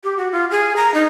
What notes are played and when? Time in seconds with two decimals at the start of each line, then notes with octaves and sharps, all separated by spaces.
0.04 G4
0.17 F#4
0.32 F4
0.51 G#4
0.76 A#5
0.94 D#4